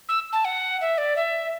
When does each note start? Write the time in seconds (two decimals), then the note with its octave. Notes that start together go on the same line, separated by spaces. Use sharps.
0.09 E6
0.33 A5
0.45 F#5
0.81 E5
0.98 D5
1.16 E5